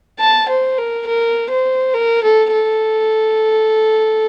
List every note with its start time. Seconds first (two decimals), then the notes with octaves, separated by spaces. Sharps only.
0.20 A5
0.49 C5
0.78 A#4
1.07 A#4
1.51 C5
1.94 A#4
2.23 A4
2.52 A4